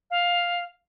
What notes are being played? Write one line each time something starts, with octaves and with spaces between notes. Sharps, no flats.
F5